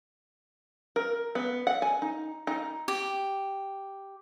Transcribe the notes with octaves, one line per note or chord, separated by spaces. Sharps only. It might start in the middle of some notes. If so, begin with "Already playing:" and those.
A#4
B3
F#5
G#5
D#4
D#4
G4